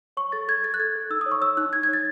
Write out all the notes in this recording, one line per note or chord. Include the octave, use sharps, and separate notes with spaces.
C#5 C#6
A4 A6
A4 G#6
A4 A6
F#6
A4 G#6
A4
D#4 E6
C#5 D#6
C#6
C#5 E6
D#4 F#6
D#4 G#6
G#6
C#5 A6